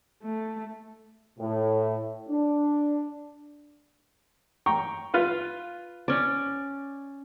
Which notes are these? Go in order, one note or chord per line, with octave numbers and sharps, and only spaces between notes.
A3
A2
D4
G5 A#5 C#6
F4 B4 F5
C#4 D5